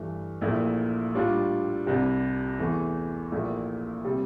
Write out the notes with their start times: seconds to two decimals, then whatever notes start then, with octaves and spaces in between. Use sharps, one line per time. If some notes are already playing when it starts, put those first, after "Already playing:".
Already playing: G2 E3 A3
0.41 A#1 A#2 A3 E4
1.14 A2 G3 D4 F4
1.86 C2 C3 G3
2.59 E2 E3 A3
3.32 A#1 A#2 A3 E4
4.05 C3 G3